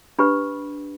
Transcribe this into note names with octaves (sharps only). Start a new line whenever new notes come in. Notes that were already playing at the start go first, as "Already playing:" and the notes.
D4 G4 B4 B5